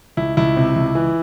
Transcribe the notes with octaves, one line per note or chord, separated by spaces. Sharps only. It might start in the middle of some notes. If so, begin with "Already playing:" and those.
C#2 E4
C#2 E4
C3
C#2
E3